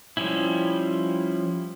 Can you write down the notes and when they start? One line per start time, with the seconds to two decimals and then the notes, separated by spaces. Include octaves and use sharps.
0.17 F3 G3 C#4 E4